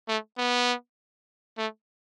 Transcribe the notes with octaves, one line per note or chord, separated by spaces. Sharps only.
A3
B3
A3